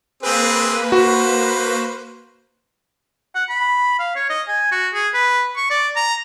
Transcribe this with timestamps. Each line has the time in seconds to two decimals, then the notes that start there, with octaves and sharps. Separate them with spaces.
0.23 A#3 C4 G#4 B4 C5
0.92 F#4 C5
3.35 F#5
3.49 B5
3.99 F5
4.16 C#5
4.30 D#5
4.48 G#5
4.72 F#4
4.94 G#4
5.14 B4
5.57 C#6
5.70 D5
5.96 A#5